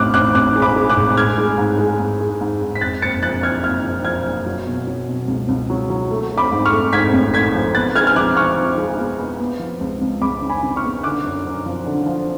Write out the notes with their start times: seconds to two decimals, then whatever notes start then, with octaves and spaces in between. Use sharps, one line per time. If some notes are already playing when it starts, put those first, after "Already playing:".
Already playing: A1 A2 D6 F6 F#6
0.14 A1 D6 F#6
0.35 A1 D6 F#6
0.56 G#3
0.62 B5 D6
0.76 G#3
0.90 D6 F#6
0.97 A2
1.17 G#3 F6 G#6
1.38 G#3
1.58 G#2
1.79 G#3
2.00 G#2
2.20 G#3
2.41 G#2
2.62 G#2
2.75 B6
2.81 F2 F#6 A6
3.02 F#1 A6 C#7
3.23 F3 F#6 A6
3.43 F3 F6 G#6
3.64 F#1 F6 G#6
3.84 F3
4.05 F3 F6 G#6
4.26 F#1
4.46 F#3
4.67 B2
4.87 F#3
5.08 B2
5.28 C#2
5.48 C#2
5.70 F#3
5.90 F#3
6.11 A3
6.31 A3
6.38 B5 D6
6.52 G#2
6.65 C#6 F6
6.72 A3
6.93 G#2 G#6 B6
7.13 A1
7.34 A3 G#6 B6
7.54 F3
7.75 B3 F#6 A6
7.95 G#3 F6 G#6
8.07 F6
8.16 F3 D6 F#6
8.37 F3 C#6 F6
8.57 F3
8.78 G#3
8.98 B3
9.19 B3
9.40 B3
9.60 F3
9.81 C#2
10.01 C#2
10.21 C#2 B5 D6
10.42 C#3
10.49 G#5 B5
10.63 C#3
10.76 C#6 F6
10.84 B3
11.03 D3 D6 F#6
11.24 F#2
11.46 F#2
11.66 F3
11.86 D3
12.06 F3